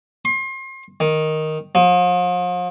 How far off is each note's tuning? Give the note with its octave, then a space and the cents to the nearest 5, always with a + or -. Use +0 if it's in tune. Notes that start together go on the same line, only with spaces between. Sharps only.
C6 +35
D#3 +0
F3 +40